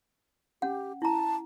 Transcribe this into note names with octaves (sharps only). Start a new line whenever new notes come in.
C#4 G4 F#5
E4 A5 A#5